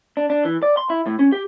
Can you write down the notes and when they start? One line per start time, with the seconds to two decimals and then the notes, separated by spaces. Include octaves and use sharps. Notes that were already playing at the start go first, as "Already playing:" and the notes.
0.17 D4
0.30 D4
0.45 E3
0.63 D5
0.77 C6
0.90 E4
1.07 A2
1.19 C#4
1.32 G4